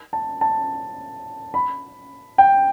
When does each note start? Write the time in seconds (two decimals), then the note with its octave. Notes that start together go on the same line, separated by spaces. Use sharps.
0.13 A5
0.41 A5
1.54 B5
2.38 G5